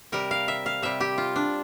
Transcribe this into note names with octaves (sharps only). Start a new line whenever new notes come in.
C3 G3 A#4
F5
E5
F5
C3 G3 E5
G4
F4
D4